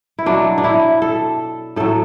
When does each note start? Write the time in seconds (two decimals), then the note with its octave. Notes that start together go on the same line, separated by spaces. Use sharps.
0.19 E4
0.26 B2 F#3 D4
0.58 D4
0.64 E4
1.02 A4
1.76 A2 F#3 A4